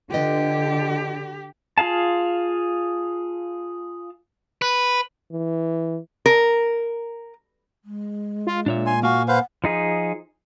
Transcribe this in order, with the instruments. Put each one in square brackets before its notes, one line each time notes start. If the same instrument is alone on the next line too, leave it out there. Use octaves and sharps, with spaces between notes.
[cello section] D3 [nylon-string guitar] F4 B4 D#5 [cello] G4
[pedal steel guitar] F4 G#4 F5 A5
[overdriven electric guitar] B4
[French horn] E3
[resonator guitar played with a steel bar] A#4
[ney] G#3
[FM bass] F4
[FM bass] A#2 [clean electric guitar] D4 C#5 E5
[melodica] G#5 C6
[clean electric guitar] A#3 G#5 [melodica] F#4 F5
[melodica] B4 C5 F5 [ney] F#5
[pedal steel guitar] F3 D#4 G#4